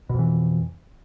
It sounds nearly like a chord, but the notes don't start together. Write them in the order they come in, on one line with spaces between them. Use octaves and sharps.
B2 F2 E3